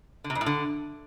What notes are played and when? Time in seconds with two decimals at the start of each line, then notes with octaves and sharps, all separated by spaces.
0.24 D3
0.30 C3
0.35 F2
0.41 A2
0.46 D3